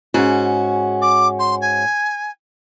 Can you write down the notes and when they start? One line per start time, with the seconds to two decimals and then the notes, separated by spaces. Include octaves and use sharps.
0.14 G#2 C#4 F#4
1.01 D6
1.39 C6
1.61 G#5